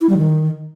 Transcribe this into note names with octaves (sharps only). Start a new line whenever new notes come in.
E4
G3
D#3